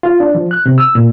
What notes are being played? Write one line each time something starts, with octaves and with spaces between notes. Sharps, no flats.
F4
D4
F3
F#6
C3
E6
A#2